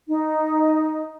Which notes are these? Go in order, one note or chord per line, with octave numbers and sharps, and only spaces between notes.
D#4